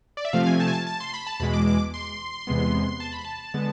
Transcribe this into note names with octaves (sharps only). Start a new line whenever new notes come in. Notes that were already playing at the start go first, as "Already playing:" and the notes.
D5
E5
C3 F3 A3 C4 F5
G#5
A5
G#5
A5
A5
C6
B5
A5
E2 B2 G#3 B5
D6
D6
C6
E2 C3 G#3 B3
A5
B5
A5
D3 G#3 B3